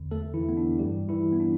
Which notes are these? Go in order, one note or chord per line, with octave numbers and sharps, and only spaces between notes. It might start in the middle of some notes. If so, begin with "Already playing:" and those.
Already playing: E2 D3
A3 A4
E3 E4
B3
D4
G2 E3 G3 G4
E3 E4
B3
D4